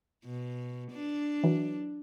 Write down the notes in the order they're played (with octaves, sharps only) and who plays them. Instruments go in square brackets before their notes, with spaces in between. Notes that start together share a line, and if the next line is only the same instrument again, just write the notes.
[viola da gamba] B2
D4
[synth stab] E3 F#3